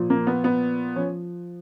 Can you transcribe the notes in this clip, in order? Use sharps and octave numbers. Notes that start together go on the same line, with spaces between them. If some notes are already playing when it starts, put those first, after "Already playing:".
Already playing: A#2 F3
A#3
B3
B3
F3 C#4